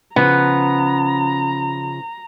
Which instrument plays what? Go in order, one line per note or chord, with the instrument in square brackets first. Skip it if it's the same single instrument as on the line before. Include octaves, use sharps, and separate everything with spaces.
[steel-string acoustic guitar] C#3 F3 [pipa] B3 [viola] A#5